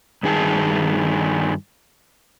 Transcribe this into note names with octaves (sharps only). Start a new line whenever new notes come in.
G2 D#3 G#4 G#5 A5